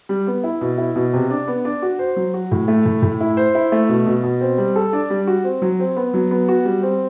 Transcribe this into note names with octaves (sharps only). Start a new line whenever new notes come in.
G3
B3
E4
B2
E4
B2
C3
D4
B3
D4
F#4
C5
F#3
F#4
A2
A3
A2
A2
E4
C5
E4
A3
B2
B2
B2
C4
G3
A4
D4
G3
F#4
C4
F#3
C4
B3
F#3
B3
F#4
G3
C4